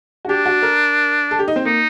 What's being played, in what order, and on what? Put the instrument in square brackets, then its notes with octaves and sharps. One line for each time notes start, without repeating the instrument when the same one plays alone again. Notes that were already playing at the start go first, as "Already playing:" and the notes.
[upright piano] F#4
[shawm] D4 [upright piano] G4
[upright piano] F#4
A#4
A4
G4
D#4
C4
[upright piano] A#3 [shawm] D#4